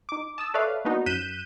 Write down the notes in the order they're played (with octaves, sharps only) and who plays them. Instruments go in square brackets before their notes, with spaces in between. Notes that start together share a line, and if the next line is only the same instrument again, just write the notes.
[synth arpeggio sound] D#4 D6
A5 D#6 E6
A4 B4 C#5 D5 E5 F5
A#3 B3 D4 D#4 F#4
F#2 F#6 G6 B6 D#7 E7